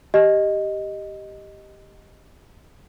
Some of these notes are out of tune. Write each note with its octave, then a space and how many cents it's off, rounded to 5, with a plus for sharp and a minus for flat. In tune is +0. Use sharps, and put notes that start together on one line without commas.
G4 +0 D#5 +0